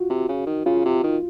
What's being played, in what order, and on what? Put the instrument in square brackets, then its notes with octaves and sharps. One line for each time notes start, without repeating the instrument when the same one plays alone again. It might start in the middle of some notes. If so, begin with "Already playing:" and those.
Already playing: [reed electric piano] F4 F#4
[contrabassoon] C3
C#3
D#3
[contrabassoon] C#3 [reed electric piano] F4
[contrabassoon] C3
D#3